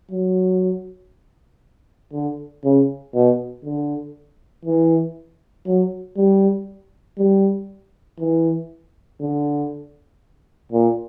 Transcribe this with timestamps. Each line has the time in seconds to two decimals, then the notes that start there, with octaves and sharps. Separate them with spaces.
0.11 F#3
2.13 D3
2.64 C#3
3.15 B2
3.65 D3
4.65 E3
5.67 F#3
6.17 G3
7.18 G3
8.20 E3
9.21 D3
10.72 A#2